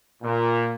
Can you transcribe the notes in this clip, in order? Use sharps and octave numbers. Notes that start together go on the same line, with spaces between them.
A#2